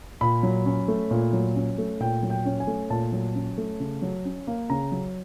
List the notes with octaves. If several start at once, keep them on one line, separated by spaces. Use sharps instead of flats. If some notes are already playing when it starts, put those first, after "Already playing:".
A#2 B5
F#3
C#4
A3
A#2
F#3
C#4
A3
A#2 G5
F#3
G5
C#4
G#5
A3
A#2 A5
F#3
C#4
A3
C#3
F#3
C#4
A#3
C#3 A#5
F#3